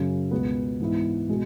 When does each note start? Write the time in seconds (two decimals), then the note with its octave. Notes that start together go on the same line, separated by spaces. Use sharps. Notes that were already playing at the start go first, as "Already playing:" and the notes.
Already playing: F#2 C#3 F#3 C#4
0.31 C#2 B2 B3 F#4
0.81 G#2 E3 B3 E4
1.29 B2 G#3